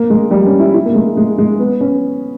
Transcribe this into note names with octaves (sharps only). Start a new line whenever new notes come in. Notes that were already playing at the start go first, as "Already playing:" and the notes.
Already playing: A#3
G#3
G3
C#4
E4
E4
A#3
G#3
G#3
G#3
B3
C#4